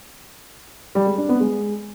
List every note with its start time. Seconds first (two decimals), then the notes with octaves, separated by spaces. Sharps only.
0.95 G3
1.06 G#3
1.18 D4
1.29 B3
1.40 G#3